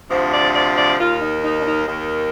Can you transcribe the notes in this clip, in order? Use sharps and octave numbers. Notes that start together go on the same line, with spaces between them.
D2 C3 F3 C5
D5
D5
D5
D#2 D#3 F4
D#4
D#4
D4
D#4
D#2 D#3